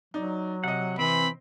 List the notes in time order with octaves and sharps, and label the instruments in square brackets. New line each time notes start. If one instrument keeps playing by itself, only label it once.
[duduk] F#3 [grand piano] D#4 D5
[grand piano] C3 D#5 [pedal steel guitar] F#5
[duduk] E3 [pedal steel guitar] C4 [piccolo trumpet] B5